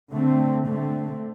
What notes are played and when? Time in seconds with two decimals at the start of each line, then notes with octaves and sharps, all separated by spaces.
0.12 D3 A3 C4
0.68 D3 A3 C4